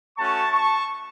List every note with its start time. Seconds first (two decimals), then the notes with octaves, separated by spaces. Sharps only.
0.17 A3 C#4 F#4 A5 C#6
0.52 A5 C#6